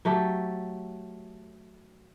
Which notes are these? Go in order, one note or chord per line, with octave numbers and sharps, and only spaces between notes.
F#3 A3 G4 A4